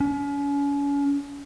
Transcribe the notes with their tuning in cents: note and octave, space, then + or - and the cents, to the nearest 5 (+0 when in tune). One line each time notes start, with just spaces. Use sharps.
C#4 +35